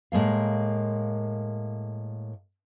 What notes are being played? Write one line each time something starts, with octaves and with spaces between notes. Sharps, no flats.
A2 G#3 A#3 F5